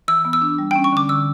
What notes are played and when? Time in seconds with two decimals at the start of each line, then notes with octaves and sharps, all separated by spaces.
0.08 E3 E6
0.25 B3
0.33 E6
0.42 D4
0.58 G3
0.71 G5
0.76 C#4
0.84 C#6
0.92 D3 D6
1.09 D3 E6